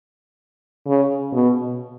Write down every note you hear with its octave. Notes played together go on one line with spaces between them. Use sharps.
C#3
B2